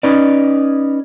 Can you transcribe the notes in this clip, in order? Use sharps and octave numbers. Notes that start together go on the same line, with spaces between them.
C#4 D#4 B4 D5